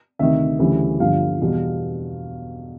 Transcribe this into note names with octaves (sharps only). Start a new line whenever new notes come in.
D2 C3 D#3 E5
D2 C#3 E3 G3
G1 G2 D3 F3 F5
E2 B2 G3